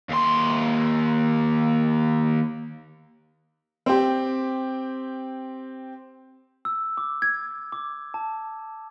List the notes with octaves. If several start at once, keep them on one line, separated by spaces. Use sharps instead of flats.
D#2 C6
C4 G4
E6
D6
G#6
D6
A5